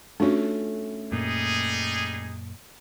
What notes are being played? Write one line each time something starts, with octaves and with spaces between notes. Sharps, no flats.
A3 C#4 D4 F4 F#4
F#2 A#2 G3 A#3 D#4 G#4